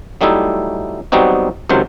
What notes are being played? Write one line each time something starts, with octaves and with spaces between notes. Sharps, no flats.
F#3 G3 A3 D#4 E4
F#3 G3 B3 C4 D#4 F#4
C#2 C3 D#3 F#3 C5